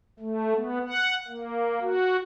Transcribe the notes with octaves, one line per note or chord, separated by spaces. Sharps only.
A3
B3
F#5
A#3
F#4